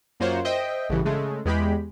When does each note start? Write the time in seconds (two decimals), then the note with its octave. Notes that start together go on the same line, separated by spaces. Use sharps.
0.20 F#2 A#3 F4 C5 C#5 F#5
0.45 C5 D#5 E5 G5
0.89 A1 G2 C#3 E3
1.05 C#3 G#3 A3
1.45 E2 G#3 G4 B5